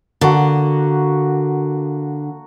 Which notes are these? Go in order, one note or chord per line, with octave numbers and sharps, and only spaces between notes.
D3 A#3 F#4